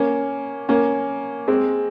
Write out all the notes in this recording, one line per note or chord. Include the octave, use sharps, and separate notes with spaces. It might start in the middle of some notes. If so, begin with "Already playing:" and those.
Already playing: A#3 C#4
A#3 C#4
G#3 C4